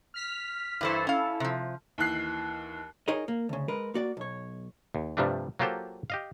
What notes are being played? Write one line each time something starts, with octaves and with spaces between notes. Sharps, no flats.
F6 B6
G2 E3 E4 A4 C5
C#4 F5
C3 F3
D#2 E3 F#6 C7
D#4 G#4 A#4 C#5 D#5
A#3
D2 C#3
G#3 A#4 B4
A#3 F#4 D5
B1 C#5
D#2
G2 C3 F3 G3 A3 D4
F#3 A#3 F4 G4 A4 C5
G4 D#5 F5